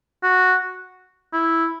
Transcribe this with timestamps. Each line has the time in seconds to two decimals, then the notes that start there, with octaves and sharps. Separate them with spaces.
0.23 F#4
1.33 E4